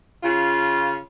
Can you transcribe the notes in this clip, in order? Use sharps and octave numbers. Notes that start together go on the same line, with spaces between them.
C#3 F4